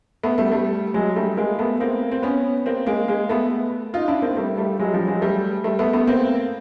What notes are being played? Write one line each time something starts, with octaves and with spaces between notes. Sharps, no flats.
A3 B3
G3 A3
G3 A3
F#3 G#3
G3 A3
G#3 A#3
A3 B3
A#3 C4
C4
B3 C#4
A#3 C4
G#3 A#3
G#3 A#3
A3 B3
D#4 F4
D4 E4
A#3 C4
G3 A3
G3 A3
F#3 G#3
F3 G3
F#3 G#3
G3 A3
G3 A3
A3 B3
A3 B3
A#3 C4